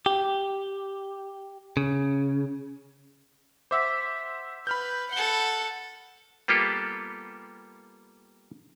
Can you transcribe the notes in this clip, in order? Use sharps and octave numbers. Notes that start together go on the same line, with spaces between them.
G4
C#3
C5 E5 F#5 D6 E6 B6
B4 B5 F6 G6
A4 F#5 G7
G3 A#3 B3 F4 G4 A4